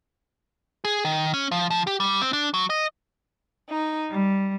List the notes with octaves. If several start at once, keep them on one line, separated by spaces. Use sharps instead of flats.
G#4
D#3
C#4
F3
F3
G4
G3
C4
D4
F#3
D#5
D#4
G3